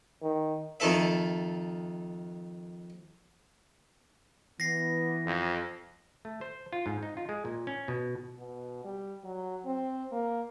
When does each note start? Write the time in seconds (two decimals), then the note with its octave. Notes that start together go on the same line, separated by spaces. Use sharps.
0.22 D#3
0.80 F2 D#3 A4 E5
4.60 E3 B3 A#6 C7
5.26 F2
6.25 A3
6.41 C5
6.73 F4
6.86 G#2
7.03 D#4
7.17 F4
7.29 G#3
7.45 A#2
7.67 C#4
7.88 B2
8.38 B2
8.85 G3
9.24 F#3
9.65 C4
10.12 A#3